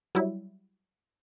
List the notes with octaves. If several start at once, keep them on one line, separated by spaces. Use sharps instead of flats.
F#3 G3 E4